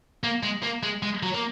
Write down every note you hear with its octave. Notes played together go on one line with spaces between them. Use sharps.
A#3
G#3
A#3
G#3
G#3
F#3
A#3